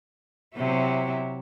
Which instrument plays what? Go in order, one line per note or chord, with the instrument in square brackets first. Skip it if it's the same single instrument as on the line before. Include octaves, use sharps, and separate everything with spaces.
[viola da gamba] C3 F#3 E4